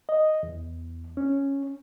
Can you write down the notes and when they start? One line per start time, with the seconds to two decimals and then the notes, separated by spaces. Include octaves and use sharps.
0.09 D#5
0.43 E2
1.17 C#4